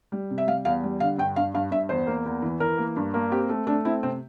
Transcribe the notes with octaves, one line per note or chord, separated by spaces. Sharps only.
G3
C3
E5
G3 F5
E2 F5
G3
D3 F5
G2 G5
G2 F5
G2 F5
G2 E5
E2 C5
A#3
E2
E3
E3 A#4
A#3
G2
A#3
C4 G4
A3
A3 D4
C4 E4
C3 C4